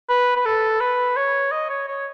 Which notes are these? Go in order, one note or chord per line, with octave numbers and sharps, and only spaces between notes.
B4
B4
A4
B4
C#5
D#5
C#5
C#5